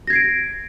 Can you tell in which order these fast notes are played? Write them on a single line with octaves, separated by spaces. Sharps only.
A#6 G#6 C7 D7